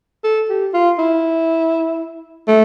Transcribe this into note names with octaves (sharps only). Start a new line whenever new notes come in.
A4
G4
F4
E4
A3